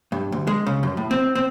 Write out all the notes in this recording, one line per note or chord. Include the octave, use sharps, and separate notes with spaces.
G2
D2
G#3
C#3
F#2
A2
C4
C4